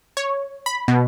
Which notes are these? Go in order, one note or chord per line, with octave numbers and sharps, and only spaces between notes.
C#5
B5
B2